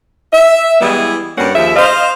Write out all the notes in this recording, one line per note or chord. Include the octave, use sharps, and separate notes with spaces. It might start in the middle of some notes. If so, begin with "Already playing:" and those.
E5
E3 G3 G#3 B3 E4 G#4
G2 G3 A#3 C#4 F#5
D#2 F3 G#4 E5
C5 D#5 F5